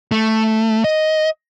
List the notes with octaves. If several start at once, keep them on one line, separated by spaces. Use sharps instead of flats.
A3
D#5